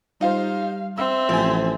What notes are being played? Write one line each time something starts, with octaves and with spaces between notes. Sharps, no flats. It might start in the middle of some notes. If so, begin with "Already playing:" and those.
G3 D#4 F4 C5 F5
C4 E5 E6
A1 F3 G#5